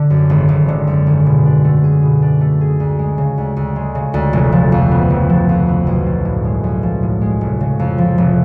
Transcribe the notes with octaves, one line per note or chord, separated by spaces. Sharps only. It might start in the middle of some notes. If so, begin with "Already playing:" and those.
Already playing: D3
F#2
G#1
G#1
D3
F#2
G#1
B2
D4
A3
G#4
B2
D4
A3
G#4
D2
G#3
C#3
D2
D2
G#3
C#3
D2
F1
F3
F2
B3
F1
F3
F2
B3
B1
F3
A2
G#3
B1
F3
A2
G#3
F1
C#3
F2
F3
F1